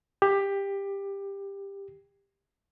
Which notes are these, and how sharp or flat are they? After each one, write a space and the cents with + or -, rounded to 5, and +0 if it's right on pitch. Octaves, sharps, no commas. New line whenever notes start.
G4 +15